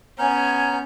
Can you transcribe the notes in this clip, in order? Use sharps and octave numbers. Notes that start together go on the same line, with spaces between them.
B3 C#4 G#5 A#5 F6 G6